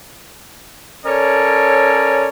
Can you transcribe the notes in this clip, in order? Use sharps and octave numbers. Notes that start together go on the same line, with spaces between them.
C#4 A4 A#4 C#5 D5